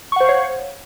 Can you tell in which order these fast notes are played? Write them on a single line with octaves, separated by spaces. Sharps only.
C#6 F#5 C5 F5 C#5